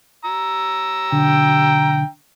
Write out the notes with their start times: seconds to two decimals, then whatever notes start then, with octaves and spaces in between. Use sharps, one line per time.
0.25 A#5 E6
1.12 B1 D3 G5